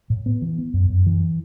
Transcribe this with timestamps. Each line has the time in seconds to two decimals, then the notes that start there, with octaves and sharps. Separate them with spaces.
0.10 A2
0.26 B3
0.42 E3
0.58 B3
0.74 F#2
0.89 F#2
1.07 E3